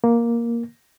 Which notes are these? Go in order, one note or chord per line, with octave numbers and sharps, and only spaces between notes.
A#3